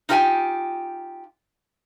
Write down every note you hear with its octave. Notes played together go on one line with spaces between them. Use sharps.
D#4 F4 G4 C#5 G5 G#5